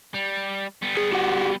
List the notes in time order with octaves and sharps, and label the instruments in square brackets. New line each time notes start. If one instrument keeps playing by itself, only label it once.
[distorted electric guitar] G3
G3 B3
[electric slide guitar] G#4
F#4 G4 F#5